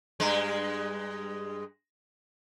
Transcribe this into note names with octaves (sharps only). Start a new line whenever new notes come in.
G2 G#3